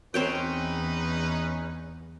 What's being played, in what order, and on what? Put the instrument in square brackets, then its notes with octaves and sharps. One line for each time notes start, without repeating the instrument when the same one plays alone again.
[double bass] E2 [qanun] C4 C#5 G5 [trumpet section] C#4 D#4 B4